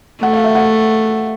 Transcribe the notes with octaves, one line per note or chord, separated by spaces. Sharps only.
A3 F#5
F5
E5
F#5